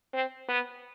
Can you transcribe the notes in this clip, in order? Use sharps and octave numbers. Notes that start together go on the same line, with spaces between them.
C4
B3